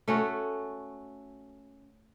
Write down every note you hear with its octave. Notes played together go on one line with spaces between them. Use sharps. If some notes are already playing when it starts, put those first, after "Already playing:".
A3 C#4 F#4